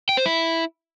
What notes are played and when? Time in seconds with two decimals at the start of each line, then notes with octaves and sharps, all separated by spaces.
0.09 G5
0.17 C5
0.26 E4